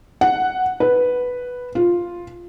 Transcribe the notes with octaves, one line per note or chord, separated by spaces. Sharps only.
F#5
B4
F4